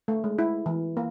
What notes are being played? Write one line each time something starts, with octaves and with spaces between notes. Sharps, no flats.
A3
G#3
E4
E3
A#3